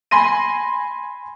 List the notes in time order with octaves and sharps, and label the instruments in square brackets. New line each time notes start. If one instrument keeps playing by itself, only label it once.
[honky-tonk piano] G#5 B5 C6 A#6 D#7